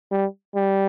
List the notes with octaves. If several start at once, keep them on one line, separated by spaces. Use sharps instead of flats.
G3
G3